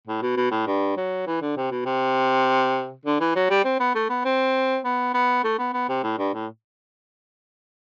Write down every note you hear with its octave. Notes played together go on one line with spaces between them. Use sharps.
A2
B2
B2
A2
G2
F#3
E3
D3
C3
B2
C3
D3
E3
F#3
G3
C4
B3
A3
B3
C4
B3
B3
A3
B3
B3
C3
A2
G2
A2